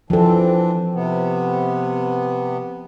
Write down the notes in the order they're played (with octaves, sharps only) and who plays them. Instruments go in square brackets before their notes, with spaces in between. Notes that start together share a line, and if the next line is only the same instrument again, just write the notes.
[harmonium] E3 C4 D4 [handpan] F3 A4
[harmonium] C3 B3